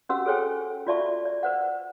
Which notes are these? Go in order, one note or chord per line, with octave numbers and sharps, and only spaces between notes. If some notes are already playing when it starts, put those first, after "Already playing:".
C#4 F#4 G4 B4 F#5 E6
G#4 A4 C5 C#5 G5 G#5
F4 F#4 D5 E5 A5 C#6
D5
B4 C5 F#5